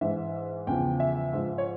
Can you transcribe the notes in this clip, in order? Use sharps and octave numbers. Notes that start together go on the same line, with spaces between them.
G#2 E3 E5
E2 C#3 F3 G5
E5
G#2 F3
C#5